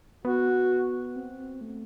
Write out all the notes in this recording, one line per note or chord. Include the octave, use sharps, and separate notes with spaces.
B3 F#4
C4
A3